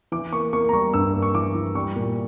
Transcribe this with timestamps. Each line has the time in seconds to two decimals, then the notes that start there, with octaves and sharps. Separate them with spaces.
0.12 E3 D6
0.32 A#3 C#6
0.53 A#3 C#6
0.69 A#5
0.73 G3 C#6
0.94 G2 E6
1.14 A#3
1.22 C#6
1.34 E3 D6
1.55 E3
1.75 G3 C#6
1.96 A#2